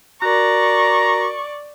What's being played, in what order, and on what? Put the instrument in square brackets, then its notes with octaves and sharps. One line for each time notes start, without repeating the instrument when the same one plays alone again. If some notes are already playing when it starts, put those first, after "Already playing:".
[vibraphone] F#4 A#4 [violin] D5 C#6 [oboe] A#5